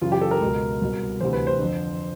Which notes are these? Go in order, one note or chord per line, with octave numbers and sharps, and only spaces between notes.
F#2 C#3 E3 F4
G4
A4
A#4
C#2 B2
C2 B2
D2 C3 E3 C5
B4
C5
F2 D3